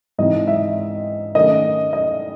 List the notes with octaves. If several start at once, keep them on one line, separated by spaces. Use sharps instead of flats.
G#2 E3 C4 D#5
E5
D#3 A3 C#4 D#5
D#5